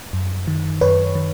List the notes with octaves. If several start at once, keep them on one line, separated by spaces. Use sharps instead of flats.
F#2
D#3
F#2 B4 C#5
D#3